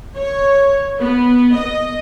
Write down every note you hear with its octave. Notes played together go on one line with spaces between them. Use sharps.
C#5
B3
D#5